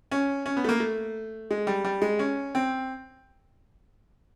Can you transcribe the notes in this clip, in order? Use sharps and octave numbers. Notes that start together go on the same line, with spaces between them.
C#4
C#4
B3
A3
A#3
A3
G#3
G3
G3
G#3
C#4
C4